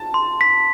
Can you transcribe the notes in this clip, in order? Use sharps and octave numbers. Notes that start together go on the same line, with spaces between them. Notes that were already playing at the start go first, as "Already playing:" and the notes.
Already playing: A5
C6
B6